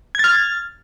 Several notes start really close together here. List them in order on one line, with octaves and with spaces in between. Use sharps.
G#6 A6 F6